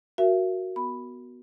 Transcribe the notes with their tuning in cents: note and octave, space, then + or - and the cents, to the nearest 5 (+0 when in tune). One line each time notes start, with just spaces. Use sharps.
F#4 +0 A#4 +0 E5 +35
B3 +0 B5 +0